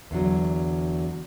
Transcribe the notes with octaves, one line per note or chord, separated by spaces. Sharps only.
E2 D3 F#3